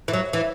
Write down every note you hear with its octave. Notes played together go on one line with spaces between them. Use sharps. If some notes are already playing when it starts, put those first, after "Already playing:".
E3
F#3
E3